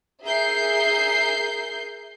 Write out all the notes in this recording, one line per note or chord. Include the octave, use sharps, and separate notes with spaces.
G#4 A#4 E5 G6 C7